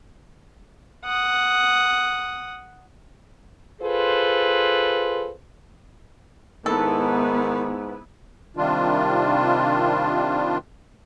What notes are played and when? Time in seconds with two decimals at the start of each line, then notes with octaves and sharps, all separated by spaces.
1.06 F#5 D#6
3.82 F4 G#4 A4 B4 C5
6.66 G#2 D#3 B3 E4 A4 B4
8.57 C3 D#3 G3 D4 F4